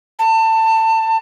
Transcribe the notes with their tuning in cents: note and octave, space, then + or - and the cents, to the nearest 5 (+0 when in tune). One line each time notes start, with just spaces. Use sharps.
A5 +25